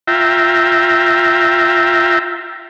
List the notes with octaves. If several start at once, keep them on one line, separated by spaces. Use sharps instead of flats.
F4 E5 G5 A#5